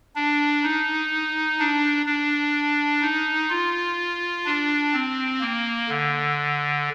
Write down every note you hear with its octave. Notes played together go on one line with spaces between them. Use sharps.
D4
D#4
D4
D4
D#4
F4
D4
C4
A#3
D3